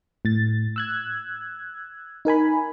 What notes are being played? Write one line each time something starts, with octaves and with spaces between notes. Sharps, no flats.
A2 A6
E6 F#6 G#6
D#4 A#4 G#5 B5